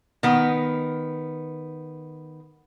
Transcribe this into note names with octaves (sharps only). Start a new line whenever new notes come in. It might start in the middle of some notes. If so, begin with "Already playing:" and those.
D#3 B3